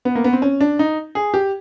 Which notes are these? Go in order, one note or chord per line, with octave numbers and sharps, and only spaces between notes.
B3
A#3
B3
C4
C#4
D4
D#4
G#4
G4